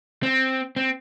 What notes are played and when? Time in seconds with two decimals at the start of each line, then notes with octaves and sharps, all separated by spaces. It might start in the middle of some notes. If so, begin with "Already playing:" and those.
0.23 C4
0.76 C4